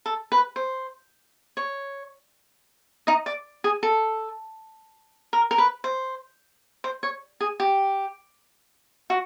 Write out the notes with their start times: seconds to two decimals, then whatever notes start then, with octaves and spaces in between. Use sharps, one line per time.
0.06 A4
0.32 B4
0.56 C5
1.57 C#5
3.07 D#4 D#5
3.26 D5
3.64 G#4
3.83 A4
5.33 A#4
5.51 A#4
5.58 B4
5.84 C5
6.84 C5
7.03 C#5
7.41 G#4
7.60 G4
9.10 F#4